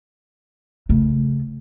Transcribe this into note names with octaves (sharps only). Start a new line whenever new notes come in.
C#3 A3